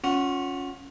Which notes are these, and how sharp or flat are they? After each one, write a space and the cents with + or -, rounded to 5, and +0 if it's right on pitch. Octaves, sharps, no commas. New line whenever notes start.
C#4 +0 F4 +30 F#5 +0